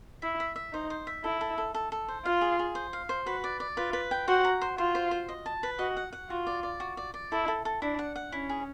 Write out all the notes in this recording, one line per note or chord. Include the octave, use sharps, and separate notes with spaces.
E4 E5
E5
E5
D#4 C5
C5
E5
E4 A4
A4
A4
A4
A4
C5
F4 F5
G#4
G#4
C5
F5
C5
F#4 B4
D5
D5
F4 B4
B4
G5
F#4 C5
A#5
C5
F4 C5
C5
C5
D#5
A5
B4
F#4 D#5
F#5
F#5
F4 F#4
D5
D5
F#4
D5
D5
E4 A4
A4
A4
D4 E4
F#5
F#5
C#4 E4
G#4